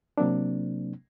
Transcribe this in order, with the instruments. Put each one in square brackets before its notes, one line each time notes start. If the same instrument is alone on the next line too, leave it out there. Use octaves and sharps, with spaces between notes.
[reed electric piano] C3 F#3 A#3 C4 D4